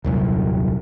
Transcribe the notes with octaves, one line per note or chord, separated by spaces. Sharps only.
D#1 C2 F#2